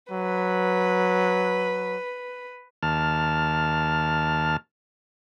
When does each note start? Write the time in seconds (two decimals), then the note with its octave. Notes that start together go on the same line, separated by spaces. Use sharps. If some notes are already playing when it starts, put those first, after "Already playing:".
0.12 F#3 B4
2.83 D#2 A5 F6